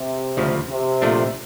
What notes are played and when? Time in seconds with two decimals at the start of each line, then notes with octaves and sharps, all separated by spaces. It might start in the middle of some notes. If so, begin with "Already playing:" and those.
Already playing: C3
0.37 D2 C#3 F3
0.69 C3
1.02 A#2 F3 A3 D4